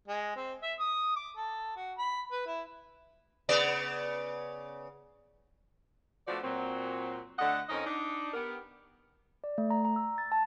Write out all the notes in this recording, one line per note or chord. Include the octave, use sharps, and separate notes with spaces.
G#3
C4
E5
D#6
D6
A4
F#4
B5
B4
E4
C#3 B3 D5
F3 A3 B3 D4 F#4 D5
A#2 F#3 C4
D3 A3 D#5 F#5
F2 C#4 D#4 A#4 D#5
D4 D#4
B3 G4 A#4
D5
A3
A#5
A#5
E6
A6
A5